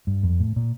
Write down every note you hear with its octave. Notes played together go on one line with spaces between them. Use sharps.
G2
F2
A2
A#2